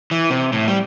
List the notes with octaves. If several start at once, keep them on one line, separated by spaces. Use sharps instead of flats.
E3
C3
A2
G3